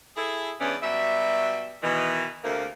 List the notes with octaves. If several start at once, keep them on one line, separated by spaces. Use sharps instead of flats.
E4 G#4 A4
E2 G2 E3 B3 C#4 D5
B2 F#3 G3 E5
B2 D#3 E3
D2 C3 A#3